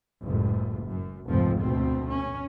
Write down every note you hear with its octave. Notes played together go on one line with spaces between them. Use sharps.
F#1 C#2 A2
F#2
F1 C#2 G#2 F3 C4
D2 B2 A3 C4
C#4